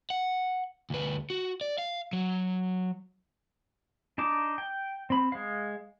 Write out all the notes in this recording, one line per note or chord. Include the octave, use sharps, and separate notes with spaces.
F#5
D2 B4
F#4
D5
F5
F#3
D4 D#4 A5 D6
G5
C4 B5
G#3 F5